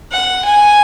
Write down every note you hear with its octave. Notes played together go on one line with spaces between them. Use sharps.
F#5
G#5